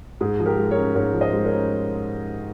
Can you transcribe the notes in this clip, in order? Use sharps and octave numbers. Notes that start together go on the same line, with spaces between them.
G#2 G#4
F3
G4 A#4
G#3
A#4 C#5
C#4
G#2 A#4 C#5
F3
C5 D#5
G#3
A#4 C#5
C#4